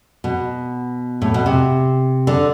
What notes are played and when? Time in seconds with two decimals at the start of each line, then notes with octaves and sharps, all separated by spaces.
0.24 B2
1.22 A2
1.34 B2
1.46 C3
2.27 D3